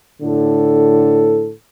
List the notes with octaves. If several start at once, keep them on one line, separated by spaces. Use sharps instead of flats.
A2 D3 A4